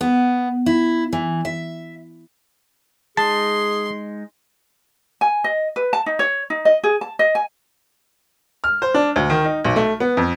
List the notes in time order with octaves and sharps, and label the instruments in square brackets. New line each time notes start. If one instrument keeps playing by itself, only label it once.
[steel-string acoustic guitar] B3
E4
E3
E5
[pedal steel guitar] G#3 D#4 [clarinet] G#4 [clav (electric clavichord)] A5 [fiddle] C6
[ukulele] G#5
D#5
B4
A5
D#4
C#5
D#4
D#5
G#4
A5
D#5
G#5
[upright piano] F6
C5
D4
D2
D#3
D#4
B1
A3
B3
F2